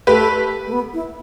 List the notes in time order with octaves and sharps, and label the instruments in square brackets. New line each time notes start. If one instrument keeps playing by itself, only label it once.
[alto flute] A3 [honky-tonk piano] G4 B4
[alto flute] A3
B3
E4